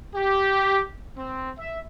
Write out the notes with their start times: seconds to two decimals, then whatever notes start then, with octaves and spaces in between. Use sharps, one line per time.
0.15 G4
1.17 C4
1.58 E5